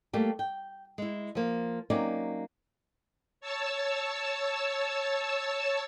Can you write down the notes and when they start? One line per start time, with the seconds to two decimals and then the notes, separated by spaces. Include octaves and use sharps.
0.13 G3 A3 A#3 G4
0.39 G5
0.98 G#3 E4
1.35 F3 A#3
1.90 F#3 A#3 C4 C#4 D#4 D5
3.41 C#5 A5 E6